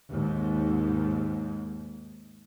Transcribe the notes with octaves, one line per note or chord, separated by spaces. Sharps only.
D#2 G#2